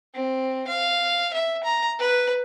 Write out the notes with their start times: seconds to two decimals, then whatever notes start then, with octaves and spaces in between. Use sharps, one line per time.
0.14 C4
0.67 F5
1.33 E5
1.64 A#5
1.99 B4